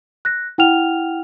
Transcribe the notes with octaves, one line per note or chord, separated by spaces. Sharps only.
F#6 A#6
E4 F#5 G5 F6 F7